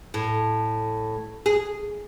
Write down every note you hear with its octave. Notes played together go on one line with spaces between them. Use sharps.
A2
G#4